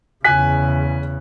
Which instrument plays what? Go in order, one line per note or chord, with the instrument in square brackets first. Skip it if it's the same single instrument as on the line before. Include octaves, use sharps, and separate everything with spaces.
[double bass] E2 C#3 [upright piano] G#5 F#6 B6